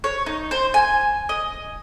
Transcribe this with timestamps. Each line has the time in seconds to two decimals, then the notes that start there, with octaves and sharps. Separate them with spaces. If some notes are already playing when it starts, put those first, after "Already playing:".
0.04 C#5
0.26 D#4
0.51 C5
0.74 G#5
1.29 D#5